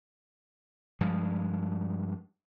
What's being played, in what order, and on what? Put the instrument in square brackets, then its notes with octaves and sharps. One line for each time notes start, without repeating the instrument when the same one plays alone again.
[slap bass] G2 F3 G#3